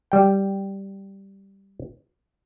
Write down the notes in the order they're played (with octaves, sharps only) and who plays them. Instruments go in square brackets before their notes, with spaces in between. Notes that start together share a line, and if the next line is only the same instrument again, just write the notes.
[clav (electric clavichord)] G3 G5